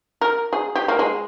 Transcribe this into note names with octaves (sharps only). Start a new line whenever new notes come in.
A#4
G#4
G4
A#3
G#3